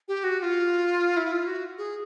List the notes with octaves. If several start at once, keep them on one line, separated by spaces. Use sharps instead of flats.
G4
F#4
F#4
F4
E4
F4
F#4
G#4